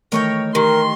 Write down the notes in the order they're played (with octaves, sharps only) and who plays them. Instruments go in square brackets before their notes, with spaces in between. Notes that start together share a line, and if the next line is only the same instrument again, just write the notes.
[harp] D#3 E3 A3 [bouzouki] A#4 C#5 G5
[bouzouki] D#3 [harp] G4 [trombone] A#4 [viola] C6